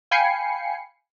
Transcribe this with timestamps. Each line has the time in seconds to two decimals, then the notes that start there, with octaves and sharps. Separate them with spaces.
0.11 F5 G5 G#5 B5 C7 C#7